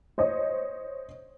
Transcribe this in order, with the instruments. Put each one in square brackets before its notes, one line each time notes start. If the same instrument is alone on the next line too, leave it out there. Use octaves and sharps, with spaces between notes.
[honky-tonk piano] C5 C#5 D#5